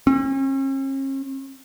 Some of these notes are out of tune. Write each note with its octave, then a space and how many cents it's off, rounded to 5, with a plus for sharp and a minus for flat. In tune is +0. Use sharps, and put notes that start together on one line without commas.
C#4 -45